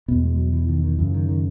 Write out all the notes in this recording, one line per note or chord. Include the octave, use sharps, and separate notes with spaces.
E2 B2 B3
G#3
F#3
E3
D#3
D#3
F#2 C#3 E3
D#3
D#3